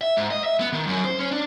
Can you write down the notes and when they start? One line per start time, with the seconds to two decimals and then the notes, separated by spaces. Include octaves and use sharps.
0.01 E5
0.17 G#2
0.31 D#5
0.44 E5
0.60 B3
0.73 D#3
0.87 F#2
1.05 C5
1.19 C#4
1.32 D4